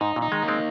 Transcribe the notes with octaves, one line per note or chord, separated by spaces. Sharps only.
G#2 D#4
A#2
D#4
D#3 G#3
A#3
G#3 C4